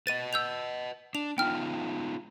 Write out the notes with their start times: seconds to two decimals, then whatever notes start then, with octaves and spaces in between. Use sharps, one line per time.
0.07 B4 D#5 A6 D#7
0.33 E6 G6 F7
1.15 D4 F7
1.38 B3 D#4 F4 G5 F6